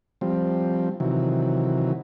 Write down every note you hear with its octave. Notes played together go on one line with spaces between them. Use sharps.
F3 G3 C4
C3 D#3 E3 F#3